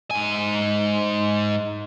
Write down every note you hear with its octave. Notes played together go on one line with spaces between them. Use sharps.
G#2 G#5